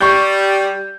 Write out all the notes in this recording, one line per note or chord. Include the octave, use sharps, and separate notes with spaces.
G3 C#6 G6